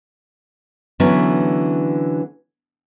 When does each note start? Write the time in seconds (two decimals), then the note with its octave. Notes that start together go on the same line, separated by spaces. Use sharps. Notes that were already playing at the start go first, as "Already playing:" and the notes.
1.00 D3 E3 F#3 B3 C#4